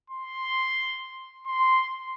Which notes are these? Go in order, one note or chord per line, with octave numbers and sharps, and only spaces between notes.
C6
C6